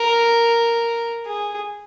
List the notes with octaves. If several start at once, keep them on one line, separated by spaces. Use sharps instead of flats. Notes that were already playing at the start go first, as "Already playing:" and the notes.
Already playing: A#4
G#4